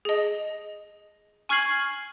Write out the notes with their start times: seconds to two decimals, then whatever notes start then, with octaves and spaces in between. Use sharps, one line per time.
0.05 G#4 D#5
1.49 G#5 C#6 F6 G#6 C7 F#7